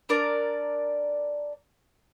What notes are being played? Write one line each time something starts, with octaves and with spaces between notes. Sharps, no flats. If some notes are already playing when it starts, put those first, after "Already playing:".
D4 A#4 D5